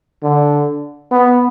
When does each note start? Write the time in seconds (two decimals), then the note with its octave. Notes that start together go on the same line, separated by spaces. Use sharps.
0.23 D3
1.11 B3